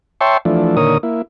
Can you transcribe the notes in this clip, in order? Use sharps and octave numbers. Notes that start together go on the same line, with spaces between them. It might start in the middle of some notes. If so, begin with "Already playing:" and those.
C#5 E5 G5 A5 C6 C#6
E3 F3 A3 D4
A#2 D3 D#3 A#4 C#5 D#6
A#3 E4